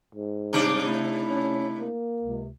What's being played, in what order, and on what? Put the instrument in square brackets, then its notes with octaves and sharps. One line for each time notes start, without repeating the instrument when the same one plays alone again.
[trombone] G#2
[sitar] C3 D4 D#4 [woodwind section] G3 D6
[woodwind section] A3 E4
[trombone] C#4
A#3
[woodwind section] C#2 C3